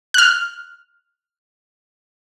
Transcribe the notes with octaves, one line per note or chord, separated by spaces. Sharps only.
F6 F#6